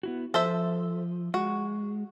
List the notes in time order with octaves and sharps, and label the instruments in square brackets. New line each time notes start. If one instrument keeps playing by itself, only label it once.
[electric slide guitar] B3 E4 F#4
[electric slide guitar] F3 [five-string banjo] A4 C5 E5
[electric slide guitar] G#3 [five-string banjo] F#4